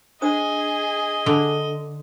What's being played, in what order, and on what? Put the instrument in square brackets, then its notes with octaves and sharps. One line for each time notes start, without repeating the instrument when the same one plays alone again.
[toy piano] D4 C5 D#6 [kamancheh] G#4 [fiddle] D#5
[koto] D3